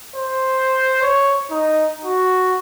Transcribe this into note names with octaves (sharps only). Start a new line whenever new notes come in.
C5
C#5
D#4
F#4